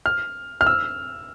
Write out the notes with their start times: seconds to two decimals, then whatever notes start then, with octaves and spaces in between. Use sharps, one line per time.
0.06 F6
0.61 F6
0.66 E6